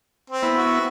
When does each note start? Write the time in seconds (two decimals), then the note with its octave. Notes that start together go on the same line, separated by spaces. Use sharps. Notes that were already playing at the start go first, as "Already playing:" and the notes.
0.30 C4
0.43 B3 E4
0.56 F#4